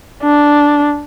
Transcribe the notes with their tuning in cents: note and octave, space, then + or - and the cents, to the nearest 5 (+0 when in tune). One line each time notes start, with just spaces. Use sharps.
D4 -5